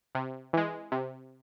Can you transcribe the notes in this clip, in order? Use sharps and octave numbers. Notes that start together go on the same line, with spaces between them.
C3
E3 G#3
C3